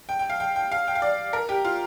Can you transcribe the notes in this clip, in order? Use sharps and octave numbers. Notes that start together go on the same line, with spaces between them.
G5
G5
F5
G5
G5
F5
G5
F5
D5
A#4
G4
F4